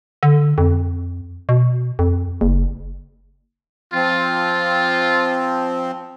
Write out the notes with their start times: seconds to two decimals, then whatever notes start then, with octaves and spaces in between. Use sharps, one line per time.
0.23 D3
0.58 F2
1.49 B2
1.99 F2
2.41 F#1
3.94 F3 C4 F4